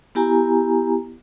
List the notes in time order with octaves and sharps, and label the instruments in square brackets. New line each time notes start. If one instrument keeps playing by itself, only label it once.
[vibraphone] B3 E4 G4 G#5 A#5